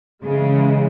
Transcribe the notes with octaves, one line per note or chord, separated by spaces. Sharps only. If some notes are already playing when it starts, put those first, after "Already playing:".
C#3 E3 G#3